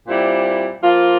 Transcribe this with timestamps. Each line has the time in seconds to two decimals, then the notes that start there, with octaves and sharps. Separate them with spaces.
0.07 A#2 G3 C4 E4 G4
0.82 F3 A#3 F4